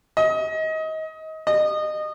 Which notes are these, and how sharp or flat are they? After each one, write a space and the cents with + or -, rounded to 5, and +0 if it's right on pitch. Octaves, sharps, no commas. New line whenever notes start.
D#5 +25
D#5 -25